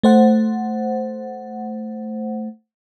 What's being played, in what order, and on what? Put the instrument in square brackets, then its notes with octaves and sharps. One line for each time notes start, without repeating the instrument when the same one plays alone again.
[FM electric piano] A3 C5 F#5